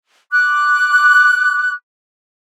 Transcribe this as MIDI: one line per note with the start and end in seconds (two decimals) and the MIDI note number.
0.32 1.72 86
0.32 1.72 90